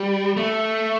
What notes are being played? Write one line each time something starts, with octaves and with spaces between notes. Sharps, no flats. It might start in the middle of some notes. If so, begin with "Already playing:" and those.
Already playing: G3
A3